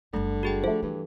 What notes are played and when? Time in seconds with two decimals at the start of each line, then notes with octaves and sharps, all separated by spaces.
0.14 F#1 D3 G3 A3
0.43 F#4 G#4 G5
0.64 F3 A3 A4
0.82 G2 E3